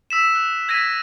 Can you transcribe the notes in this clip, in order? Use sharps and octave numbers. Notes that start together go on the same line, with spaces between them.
E6 B6 E7
F#6
E6 G#6 A#6 B6 D#7